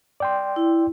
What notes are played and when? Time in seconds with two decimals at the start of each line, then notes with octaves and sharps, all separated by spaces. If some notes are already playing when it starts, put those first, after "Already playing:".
0.20 D5 G5 C6
0.56 E4